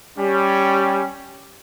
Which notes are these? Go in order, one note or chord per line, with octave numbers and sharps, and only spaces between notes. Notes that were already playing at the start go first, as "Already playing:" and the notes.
G3 C#4